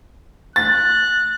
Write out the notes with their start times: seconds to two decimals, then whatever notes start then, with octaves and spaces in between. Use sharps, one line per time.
0.56 F#6 A6